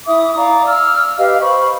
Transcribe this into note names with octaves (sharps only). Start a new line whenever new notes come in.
E4 E5 D6 D#6
D5 F5 A#5 D6
E6 F6
G4 B4 D#5 F5
C5 B5 C#6